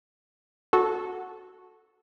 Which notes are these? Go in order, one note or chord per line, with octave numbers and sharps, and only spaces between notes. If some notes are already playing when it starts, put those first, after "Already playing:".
F#4 A4